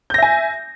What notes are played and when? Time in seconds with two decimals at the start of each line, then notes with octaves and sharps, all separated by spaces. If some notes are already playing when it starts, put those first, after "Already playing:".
0.10 G6
0.14 A#6
0.18 E5
0.22 G#5